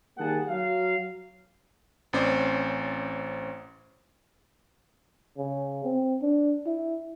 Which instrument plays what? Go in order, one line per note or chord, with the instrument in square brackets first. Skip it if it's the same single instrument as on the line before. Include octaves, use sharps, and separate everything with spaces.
[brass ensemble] D#3 G3 A#3 G#4 F#5 A5
F#3 F5
[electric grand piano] A1 C4 C#4 C5 D5
[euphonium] C#3
C4
D4
E4